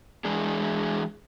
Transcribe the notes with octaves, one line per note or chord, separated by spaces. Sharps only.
E3 G#3 D4 G#4